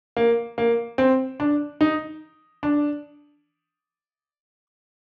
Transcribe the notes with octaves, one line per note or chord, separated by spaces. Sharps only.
A#3
A#3
C4
D4
D#4
D4